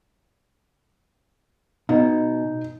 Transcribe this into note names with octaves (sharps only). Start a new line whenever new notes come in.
B2 D#4